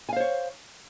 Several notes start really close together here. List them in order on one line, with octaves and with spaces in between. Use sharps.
G#5 F5 C5 C#5